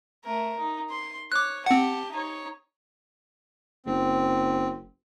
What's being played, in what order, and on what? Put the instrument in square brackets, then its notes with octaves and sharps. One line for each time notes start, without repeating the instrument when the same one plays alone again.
[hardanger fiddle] A3 A#4
D#4
C6
[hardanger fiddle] C#5 [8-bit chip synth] D6 F#6
[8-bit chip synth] C4 F#5 [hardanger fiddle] G4 A5
[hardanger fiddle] D#4 C#5
[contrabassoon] F#1 [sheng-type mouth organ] C4